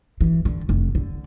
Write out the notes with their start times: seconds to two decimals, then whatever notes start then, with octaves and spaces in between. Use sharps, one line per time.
0.21 E3
0.45 D3
0.69 F1
0.95 D3